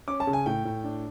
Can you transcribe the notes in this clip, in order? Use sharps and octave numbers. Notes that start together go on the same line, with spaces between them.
C#4 D6
A5
C#3
G#5
A2 G5
A2
D4